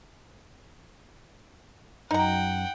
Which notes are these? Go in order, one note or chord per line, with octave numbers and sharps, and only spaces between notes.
F#2 D#4 F#5 G5 A#5